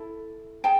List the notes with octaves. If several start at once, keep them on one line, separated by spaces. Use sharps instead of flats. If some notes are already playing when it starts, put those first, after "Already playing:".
Already playing: E4 A4
G#4 G5 A5